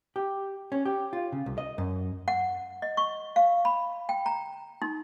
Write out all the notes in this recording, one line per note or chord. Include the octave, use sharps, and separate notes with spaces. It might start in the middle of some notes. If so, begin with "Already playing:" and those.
G4
C#4
G4
F4
C#3
C2
D#5
F#2
F#5
D#5
C#6
F5
B5
G5
A#5
D#4